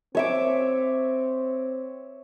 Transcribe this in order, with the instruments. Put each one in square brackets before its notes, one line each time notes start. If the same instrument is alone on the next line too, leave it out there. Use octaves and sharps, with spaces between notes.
[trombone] C4 [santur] C#5 E5 D6